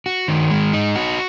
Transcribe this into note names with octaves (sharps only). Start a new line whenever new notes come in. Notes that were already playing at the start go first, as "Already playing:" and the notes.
F#4
D#3
G#3
D#4
F#4